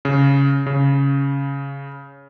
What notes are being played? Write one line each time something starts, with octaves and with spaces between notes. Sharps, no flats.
C#3
C#3